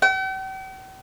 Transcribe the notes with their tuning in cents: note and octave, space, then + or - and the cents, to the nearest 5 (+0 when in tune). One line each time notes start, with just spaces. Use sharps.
G5 -45